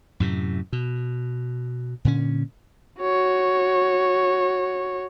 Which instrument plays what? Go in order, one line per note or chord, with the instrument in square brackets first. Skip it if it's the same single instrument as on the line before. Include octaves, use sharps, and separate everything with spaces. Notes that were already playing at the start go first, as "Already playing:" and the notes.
[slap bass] F#2 A2 C3
B2
A#2 D3 C#4
[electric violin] F#4 C#5